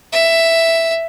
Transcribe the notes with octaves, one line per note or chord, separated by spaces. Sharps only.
E5